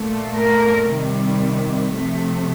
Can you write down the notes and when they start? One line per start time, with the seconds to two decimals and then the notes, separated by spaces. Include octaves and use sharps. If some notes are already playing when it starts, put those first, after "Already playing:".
Already playing: A#2 A3
0.36 A#4
0.89 C3 D#3 G3
1.93 C3 F3 A3